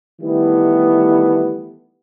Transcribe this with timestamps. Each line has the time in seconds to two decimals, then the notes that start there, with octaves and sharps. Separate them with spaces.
0.21 D#3 E3 G3 A3 B3 E4